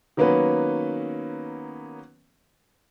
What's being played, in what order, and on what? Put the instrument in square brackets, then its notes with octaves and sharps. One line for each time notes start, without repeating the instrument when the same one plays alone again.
[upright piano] D#3 F#3 A#3 B3 C#4 B4